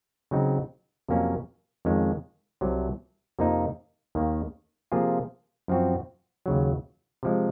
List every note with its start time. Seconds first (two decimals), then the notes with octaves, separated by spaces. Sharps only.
0.31 C#3 F#3 C4 D#4
1.09 F2 C3 F#3 A#3 C#4
1.85 F2 D#3 G#3 C#4
2.61 C2 C3 F#3
3.39 F2 C3 F3 A#3 D#4
4.15 D#2 D#3 A#3
4.92 C3 F3 A#3 F4 G#4
5.68 F#2 F3 C4 F#4
6.46 D#2 C#3 F#3
7.23 C3 F3 G#3